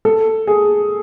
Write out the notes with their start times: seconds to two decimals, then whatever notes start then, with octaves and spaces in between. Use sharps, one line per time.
0.05 A4
0.47 G#4